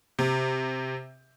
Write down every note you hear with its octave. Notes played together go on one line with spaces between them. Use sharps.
C3